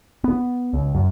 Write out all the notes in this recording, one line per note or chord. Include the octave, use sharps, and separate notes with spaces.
B3
C#2
F#2